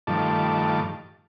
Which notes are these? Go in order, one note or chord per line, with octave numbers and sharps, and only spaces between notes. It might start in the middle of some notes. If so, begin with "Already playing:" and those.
G2 D#3 F3 A3 A5 D6